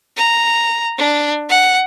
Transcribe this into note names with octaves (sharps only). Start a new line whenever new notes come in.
A#5
D4
F#5